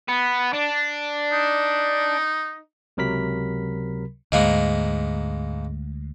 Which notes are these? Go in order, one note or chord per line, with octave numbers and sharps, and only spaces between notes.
B3
D4
D#4
C#2 C3 F#3 A#4 B5 B6
D2 G#2 G#3 A#3 B3